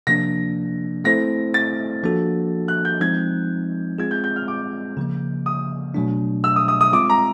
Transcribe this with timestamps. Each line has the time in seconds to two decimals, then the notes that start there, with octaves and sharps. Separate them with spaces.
0.07 C3 F3 A#3 D4 A#6
1.04 A3 C4 E4 A4 C5 A#6
1.54 A6
2.03 F3 A#3 D4 F#4 A4
2.68 F#6
2.85 G6
3.01 F3 G#3 C4 D#4 G#6
3.98 G#3 C4 F4 G#4 G#6
4.11 G6
4.24 G6
4.36 F6
4.48 D6
4.97 C#3 F3 A#3
5.46 D#6
5.94 B2 F#3 A3 D4
6.44 E6
6.56 D#6
6.68 D#6
6.81 D#6
6.93 G#3 C4 F4 D6
7.10 A#5